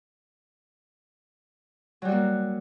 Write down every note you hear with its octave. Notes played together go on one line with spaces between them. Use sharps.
F#3 G3 A#3 F#4